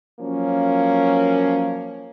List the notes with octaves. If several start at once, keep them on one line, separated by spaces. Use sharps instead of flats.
F3 F#3 A#3 C#4